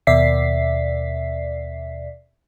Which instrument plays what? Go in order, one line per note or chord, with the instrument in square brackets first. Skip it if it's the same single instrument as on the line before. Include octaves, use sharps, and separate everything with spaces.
[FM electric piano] D#2 B2 D5 E5 B6 C7